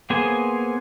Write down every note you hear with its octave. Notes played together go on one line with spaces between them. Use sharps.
A#3 B3 G#4 C5 G#5